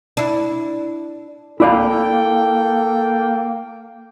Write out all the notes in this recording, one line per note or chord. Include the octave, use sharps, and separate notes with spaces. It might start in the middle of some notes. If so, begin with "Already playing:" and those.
D4 E4
A#3 E4 A4 D5 F5 G5